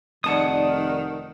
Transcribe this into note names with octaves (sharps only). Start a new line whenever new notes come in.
F1 D#3 G#4 D5 D#5 F#5 A5 D#6